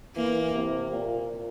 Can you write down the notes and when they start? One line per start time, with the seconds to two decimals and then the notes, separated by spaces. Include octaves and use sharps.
0.16 E3 A#3
0.54 C3
0.92 A#2